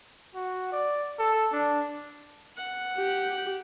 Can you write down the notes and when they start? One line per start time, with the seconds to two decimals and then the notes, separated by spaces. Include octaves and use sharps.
0.35 F#4
0.72 D5
1.19 A4
1.52 D4
2.57 F#5
2.97 G4